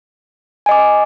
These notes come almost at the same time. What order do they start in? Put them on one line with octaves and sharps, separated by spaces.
G#5 D#5 D6